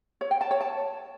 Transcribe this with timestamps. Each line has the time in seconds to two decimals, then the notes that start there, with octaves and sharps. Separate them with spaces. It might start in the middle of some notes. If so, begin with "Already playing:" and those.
0.21 C#5
0.31 G5
0.41 A5
0.51 C#5
0.61 A5